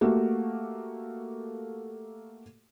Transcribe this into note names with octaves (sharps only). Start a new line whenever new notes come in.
A3 A#3 F#4 G4